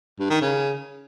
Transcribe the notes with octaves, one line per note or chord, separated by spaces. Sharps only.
G2
D#3
C#3